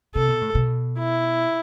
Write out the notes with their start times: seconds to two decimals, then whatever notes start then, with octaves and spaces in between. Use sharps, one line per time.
0.15 C3 A4
0.28 B2
0.41 A2
0.55 B2
0.99 E4